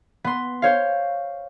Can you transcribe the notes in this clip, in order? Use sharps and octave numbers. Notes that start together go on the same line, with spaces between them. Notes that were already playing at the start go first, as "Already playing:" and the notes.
B3 C6
C5 C#5 F5